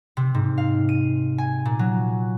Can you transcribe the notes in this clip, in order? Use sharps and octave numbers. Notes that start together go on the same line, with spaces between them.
C3
G#2
F5
D#7
G#5
A#2
F#3